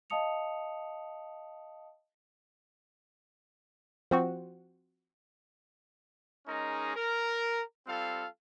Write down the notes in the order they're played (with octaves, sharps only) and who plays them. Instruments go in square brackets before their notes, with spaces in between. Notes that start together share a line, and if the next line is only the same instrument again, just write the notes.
[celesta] D#5 F5 A5 D#6 C#7 F7
[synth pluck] F3 C4 F#4
[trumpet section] G#3 C#4 D#4 G#4 A#4
A#4
G3 C4 F4 A4 F5